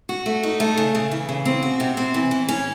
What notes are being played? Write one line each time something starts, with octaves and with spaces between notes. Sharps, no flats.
F#4
A3
D#4
A3
C#3
C#3
E3
C#3
C4
F#4
C3
C4
E3
E3
C#4